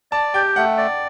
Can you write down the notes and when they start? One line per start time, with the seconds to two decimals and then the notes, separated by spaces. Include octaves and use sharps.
0.12 D5 A5
0.34 G4 G5
0.56 A3 F#5
0.78 D5